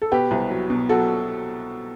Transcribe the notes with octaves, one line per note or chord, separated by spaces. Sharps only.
A4
B2 G4 B4
C2
F#3
B2
F#3 F#4 A4